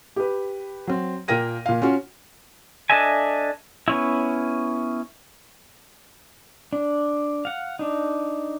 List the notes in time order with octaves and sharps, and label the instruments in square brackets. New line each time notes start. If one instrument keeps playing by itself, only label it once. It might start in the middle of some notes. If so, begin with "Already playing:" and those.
[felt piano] G4 B4
F#3 C4
A#2 A#3 A#4 G5 A#6 D#7
A#2 F5
C#4 F4 F#4
[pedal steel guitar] D4 A4 D#5 E5 G#5
B3 C#4 E4
D4
F5 F#5
D4 D#4